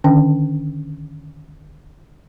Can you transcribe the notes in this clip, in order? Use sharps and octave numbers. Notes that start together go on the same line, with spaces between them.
D3 D#3 C#4 D4 G5